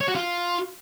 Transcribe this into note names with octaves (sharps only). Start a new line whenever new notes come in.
C#5
F#4
F4